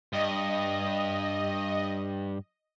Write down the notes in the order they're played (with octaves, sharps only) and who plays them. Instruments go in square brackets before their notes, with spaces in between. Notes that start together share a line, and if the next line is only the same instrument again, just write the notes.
[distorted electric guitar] G2 [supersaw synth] D#5